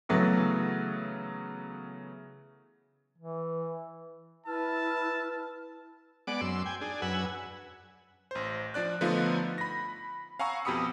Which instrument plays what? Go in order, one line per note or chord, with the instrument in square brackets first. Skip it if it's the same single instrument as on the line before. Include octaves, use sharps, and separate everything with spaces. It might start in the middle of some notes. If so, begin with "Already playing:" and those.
[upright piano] C#3 E3 F#3 A3 B3 F#4
[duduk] E3
[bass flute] E4 [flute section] B4 E6 F6 [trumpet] A5
[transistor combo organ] G#3 B3 D5 F#5 D6
F#2 C6 E6
G5 G#5
D4 G#4
F#2 B4 F#5 G#5 E6
[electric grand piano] A1 C5
F3 D4 D5 F#6
D3 F3 A3 B3 D#4 F4
B5 A#6
F5 F#5 G#5 A#5 C#6 E6
F2 B2 G4 B5 D#6 C#7